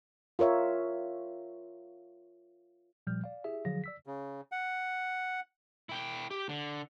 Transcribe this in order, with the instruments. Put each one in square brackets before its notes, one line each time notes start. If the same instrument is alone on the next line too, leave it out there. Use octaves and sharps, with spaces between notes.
[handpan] F4 A#4 C#5 E5
[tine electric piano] A#2 F3 G3 F6 G6
D5 F5
E4 G4 G#4 E5
D3 F3 F#3 G#4 F5 A#6
D5 E6 B6
[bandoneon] C#3
F#5
[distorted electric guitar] E4 G5
G4
D3